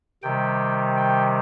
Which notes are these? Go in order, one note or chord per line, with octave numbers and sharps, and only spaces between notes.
C3 D#3 G3 G5
G5